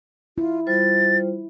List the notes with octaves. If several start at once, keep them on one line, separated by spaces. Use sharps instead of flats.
E4 F4
G3 F4 C5 A6